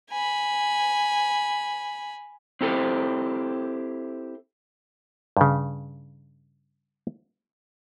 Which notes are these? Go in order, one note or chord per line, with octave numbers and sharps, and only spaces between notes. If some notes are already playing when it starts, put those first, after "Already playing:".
G#5 B5
C4 E4 G4 A4 C5
G2 C#3